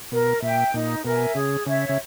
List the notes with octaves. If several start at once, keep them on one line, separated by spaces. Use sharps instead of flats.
B2 A#4
A#2 E5 G5
A#2 D#4
B2 A#4 E5 G#5
C#3 G#4
C#3 C#5 E5
C#3